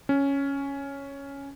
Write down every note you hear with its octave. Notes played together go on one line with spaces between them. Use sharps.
C#4